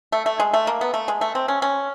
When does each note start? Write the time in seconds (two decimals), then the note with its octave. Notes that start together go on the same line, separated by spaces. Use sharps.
0.12 A3
0.26 A3
0.40 G#3
0.54 A3
0.67 A#3
0.81 B3
0.94 A3
1.08 G#3
1.21 A3
1.35 C4
1.48 C#4
1.62 C#4